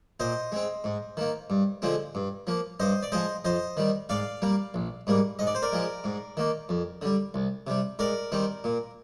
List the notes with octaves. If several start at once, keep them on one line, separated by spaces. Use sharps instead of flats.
A#2 C5 D#5
G#3 C4
G#2
D#3 A#3
G2
D3 F3 G#3 C4
G2
F3 A#3
G2 C5 D#5
D5
F3 G#3 C5 D#5
F2 C5 D#5
D#3 G3
G#2 D5 F5
G3 A#3
A#1
G#2 G3 A#3
G#2 D#5
D5
C5
A#4 D5
F3 G#3
G#2
D#3 A#3
F2
D3 G3
C2
C3 G3
G#2 A#4 D5
D#3 G3 C4
A#2